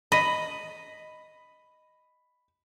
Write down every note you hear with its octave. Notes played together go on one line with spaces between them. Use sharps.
D#5 B5